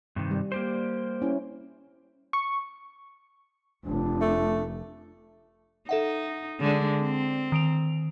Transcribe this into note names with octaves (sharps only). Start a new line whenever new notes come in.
G2 C3 D#3
G3
A#3 G4 C5
C#4 E4
C#6
F1 D4
A3
D#4 A4 E5 F#5
D3 G#3
C4
D#3 D7 F7